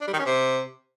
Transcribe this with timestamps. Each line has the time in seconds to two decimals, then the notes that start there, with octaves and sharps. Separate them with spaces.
0.01 D4
0.07 G3
0.13 D#3
0.19 C#4
0.25 C3